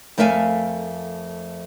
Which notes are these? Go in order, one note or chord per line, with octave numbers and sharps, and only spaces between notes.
F2 A3 A#4 E5 F5 G#5